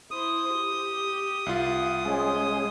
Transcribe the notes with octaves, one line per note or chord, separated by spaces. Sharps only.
E4 C5 D#6
G4
C2 F4
G#3 C#4 G#4 C5